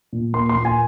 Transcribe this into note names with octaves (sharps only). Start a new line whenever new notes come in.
A#2
A#3 C6
C6
A#2
G#5